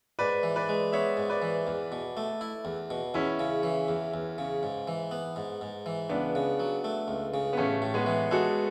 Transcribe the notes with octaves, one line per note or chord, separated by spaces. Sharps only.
G#2 B4 D5
E3
B4 D5
G#3
B3 C#5 E5
G#2
B4 D5
E3
E2
B2
A3
E4
E2
B2
E2 C#4 E4
C#3
E3
E2
E2
C#3
G#2
E3
B3
G#2
G#2
E3
C#2 B3 D4
C#3
F#3
A3
C#2
C#3
B3
A1 A3 C#4
A2
G#3 B3
E3
G#3 F#4 A4